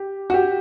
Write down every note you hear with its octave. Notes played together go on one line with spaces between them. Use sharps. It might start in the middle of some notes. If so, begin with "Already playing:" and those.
Already playing: G4
F#4
G4